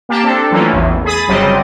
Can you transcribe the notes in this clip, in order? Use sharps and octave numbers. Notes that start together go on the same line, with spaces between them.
A#3 G4 A5
C4 D4 A4
E3 F#3 A3 A#3 C#4 F4
A1 E2 A2
G#4 B5 D#6 A6
G1 C#3 F#3 G3 C4 D#5